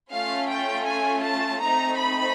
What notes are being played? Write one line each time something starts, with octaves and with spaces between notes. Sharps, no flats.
A3 C#4 F4 F5
G5
G#5
A5
A3 C4 D#4 A#5
B5